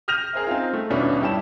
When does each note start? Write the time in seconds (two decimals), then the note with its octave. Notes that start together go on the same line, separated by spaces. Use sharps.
0.08 D#6 F6 G6 A#6 D#7 F7
0.33 G#4 A#4 C5 E5
0.47 C4 D#4 F4
0.73 A3
0.90 D#1 B2 C#4 D4 E4 B4
1.21 G2 E4 G4 C#5 A5 E7